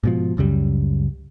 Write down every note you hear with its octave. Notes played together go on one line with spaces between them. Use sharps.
G#2 B2 F3
C#2 F#2 C#3 G3